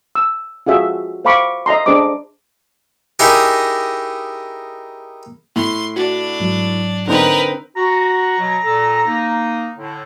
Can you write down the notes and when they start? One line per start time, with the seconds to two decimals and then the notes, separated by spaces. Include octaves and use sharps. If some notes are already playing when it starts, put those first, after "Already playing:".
0.15 E6
0.67 F4 F#4 G#4 E5 F5
1.25 C5 E5 F5 B5 C#6 D6
1.66 D#5 E5 A#5 C6
1.86 D4 G#4 C5 D#5 D6
3.19 D#4 E4 G4 G#4 A#4
5.56 A2 C6
5.96 D4 F#4
6.40 G#2 F#3
7.08 D3 C4 D#4 A#4 B4
7.77 F#4 A#5
8.39 B2 F#3
8.63 A#2 A4
9.06 A#3 D#4
9.77 A2 D3